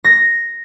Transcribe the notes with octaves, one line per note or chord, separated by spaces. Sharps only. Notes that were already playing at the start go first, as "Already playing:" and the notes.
A#6